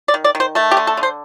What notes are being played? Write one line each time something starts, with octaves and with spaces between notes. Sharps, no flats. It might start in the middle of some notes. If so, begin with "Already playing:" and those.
D5
D#3
D5
D#3
C5
A3 A4
G4
D3
A4
D3
C5